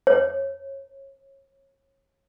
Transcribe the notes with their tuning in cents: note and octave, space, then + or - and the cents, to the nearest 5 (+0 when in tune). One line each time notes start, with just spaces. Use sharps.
C#5 -30